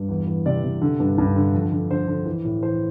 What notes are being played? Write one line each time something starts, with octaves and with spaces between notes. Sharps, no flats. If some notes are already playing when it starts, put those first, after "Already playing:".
Already playing: G2
E2
E3
C3 D5
C3
D3
G2
G2
D3
F2
D3
D3 C5
D3
E3
A2
E3 C5